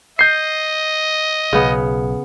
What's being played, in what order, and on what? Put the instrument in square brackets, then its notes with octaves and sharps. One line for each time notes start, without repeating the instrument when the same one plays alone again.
[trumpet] D#5 [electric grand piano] G6 C7
[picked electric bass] B1 [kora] C#3 B3